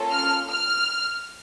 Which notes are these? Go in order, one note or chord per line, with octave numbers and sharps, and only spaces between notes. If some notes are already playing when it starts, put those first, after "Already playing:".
Already playing: A#3 C#4 F4 A4
F6
F6